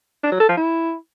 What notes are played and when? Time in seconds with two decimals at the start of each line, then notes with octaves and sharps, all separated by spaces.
0.23 D4
0.32 F#3
0.40 A4
0.49 F3
0.57 E4